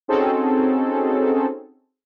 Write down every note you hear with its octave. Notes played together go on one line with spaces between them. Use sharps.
C4 C#4 D#4 F#4 G#4 A4